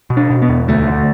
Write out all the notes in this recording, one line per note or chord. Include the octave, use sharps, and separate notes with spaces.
B2
D4
B2
B3
E2
D2 A3
D3